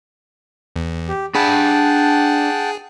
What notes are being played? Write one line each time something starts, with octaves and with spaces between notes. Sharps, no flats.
E2
G4
D4 G#4 F#5 G5 A5 B5